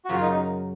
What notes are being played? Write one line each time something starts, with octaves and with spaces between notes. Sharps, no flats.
F#4
F#2 C#3 F#3 F4
D#4